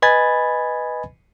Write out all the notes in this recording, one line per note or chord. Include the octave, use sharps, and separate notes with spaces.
B4 D#5 G#5 B5 G#6 A6